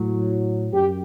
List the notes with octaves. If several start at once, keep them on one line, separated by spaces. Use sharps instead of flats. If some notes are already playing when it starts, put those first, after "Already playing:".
Already playing: A2 F#3
F#2 G4